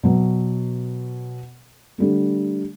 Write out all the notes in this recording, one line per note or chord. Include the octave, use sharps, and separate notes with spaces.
B2 F#3
D3 G3 A3